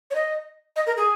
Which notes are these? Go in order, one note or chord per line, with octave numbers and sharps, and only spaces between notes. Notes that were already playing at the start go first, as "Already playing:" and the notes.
C#5
D#5
D#5
A#4
G#4